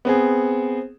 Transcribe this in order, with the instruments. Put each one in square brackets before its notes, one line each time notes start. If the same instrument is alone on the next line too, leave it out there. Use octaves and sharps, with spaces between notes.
[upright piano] B3 C4 G#4